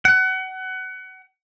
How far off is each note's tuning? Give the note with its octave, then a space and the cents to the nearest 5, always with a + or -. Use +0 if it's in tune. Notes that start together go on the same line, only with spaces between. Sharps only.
F#5 +25